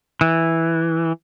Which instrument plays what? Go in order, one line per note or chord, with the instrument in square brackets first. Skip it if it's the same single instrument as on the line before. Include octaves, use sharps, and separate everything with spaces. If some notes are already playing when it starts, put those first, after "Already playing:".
[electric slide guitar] E3